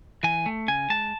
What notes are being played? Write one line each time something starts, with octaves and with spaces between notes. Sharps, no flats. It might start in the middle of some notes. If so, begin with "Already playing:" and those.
E3 G#5
A3
C#3 G#5
G#3 A5